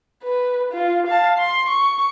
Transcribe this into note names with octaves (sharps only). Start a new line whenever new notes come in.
B4
F4
F5 A5
C6
C#6